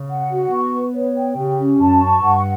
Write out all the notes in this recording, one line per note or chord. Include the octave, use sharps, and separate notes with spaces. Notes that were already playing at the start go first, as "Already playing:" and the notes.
Already playing: C#3
F#5
F#4
B3 C#6
B4
C#5
G5
C#3 G4
C#4
F#2 A5
C#6
G2 F#5